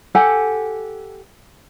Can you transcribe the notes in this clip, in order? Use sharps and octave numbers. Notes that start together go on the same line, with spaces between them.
G4 A4 F#5 G#5